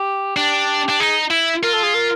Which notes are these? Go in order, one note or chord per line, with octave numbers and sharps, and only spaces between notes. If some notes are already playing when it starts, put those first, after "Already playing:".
Already playing: G4
D4 G4
D4
D#4 G#4
E4
F4 A#4
A4
G#4
A#4